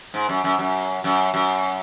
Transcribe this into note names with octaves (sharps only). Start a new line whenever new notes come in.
G#2
F#2
F#2
F#2
F#2
F#2